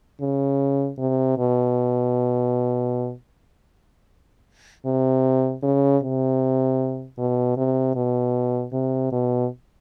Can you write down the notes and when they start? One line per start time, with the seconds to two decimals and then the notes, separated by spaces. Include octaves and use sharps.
0.21 C#3
0.98 C3
1.38 B2
4.85 C3
5.63 C#3
6.02 C3
7.18 B2
7.57 C3
7.96 B2
8.72 C3
9.12 B2